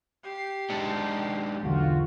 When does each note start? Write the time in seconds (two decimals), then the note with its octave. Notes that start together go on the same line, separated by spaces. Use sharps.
0.24 G4 C7
0.70 G#3 D4 D#4 A5 C#7
1.63 B1 E2 D3 F4 F#4